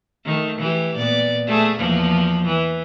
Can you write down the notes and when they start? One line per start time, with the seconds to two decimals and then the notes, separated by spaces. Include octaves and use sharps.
0.25 D#3 A3
0.59 E3 G4
0.96 A#2 B3 D5
1.47 A3 G#4
1.76 E2 F3 A#3
2.46 E3